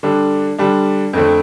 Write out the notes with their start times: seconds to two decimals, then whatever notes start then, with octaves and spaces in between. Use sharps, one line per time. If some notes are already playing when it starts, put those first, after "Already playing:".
0.03 D3 G3 D4
0.58 D3 G3 D4
1.13 F2 D3 A3 C4